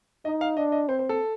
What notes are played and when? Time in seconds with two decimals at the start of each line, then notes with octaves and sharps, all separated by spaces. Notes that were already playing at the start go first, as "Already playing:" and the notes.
0.25 D#4 D#5
0.41 F5
0.57 D4 D#5
0.72 D#5
0.88 C4 C5
0.99 C5
1.09 A4